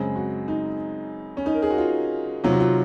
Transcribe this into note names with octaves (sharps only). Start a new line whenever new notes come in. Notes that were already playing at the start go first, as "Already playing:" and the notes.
Already playing: F#2 C#3 G#3 C4
F#4
D#4
C#4
D#4
A#4
G#4
F#4
F4
C3 D#3 F#3 F4
F#4
F4